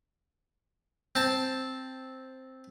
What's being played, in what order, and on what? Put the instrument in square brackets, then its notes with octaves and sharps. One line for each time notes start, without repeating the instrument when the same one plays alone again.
[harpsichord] C4 A5